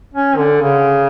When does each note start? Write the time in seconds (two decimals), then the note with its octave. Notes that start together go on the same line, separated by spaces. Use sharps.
0.14 C#4
0.37 D3
0.61 C#3